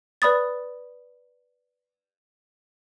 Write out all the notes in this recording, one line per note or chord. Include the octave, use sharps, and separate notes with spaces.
B4 D5 B5 D#6 A6